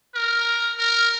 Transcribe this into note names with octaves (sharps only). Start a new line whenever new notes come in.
A#4
A#4